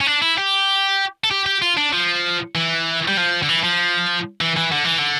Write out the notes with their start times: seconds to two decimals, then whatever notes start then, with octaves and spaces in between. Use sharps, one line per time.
0.01 C#4
0.07 D4
0.22 E4
0.38 G4
1.24 A4
1.31 G4
1.46 G4
1.62 F4
1.77 D4
1.93 F3
2.55 E3
3.08 G3
3.17 F3
3.43 D3
3.49 E3
3.64 F3
4.41 E3
4.57 E3
4.72 D3
4.85 E3
4.99 D3